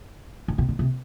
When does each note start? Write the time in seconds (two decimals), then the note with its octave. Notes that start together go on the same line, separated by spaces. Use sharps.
0.48 D3
0.58 C3
0.69 D3
0.79 C3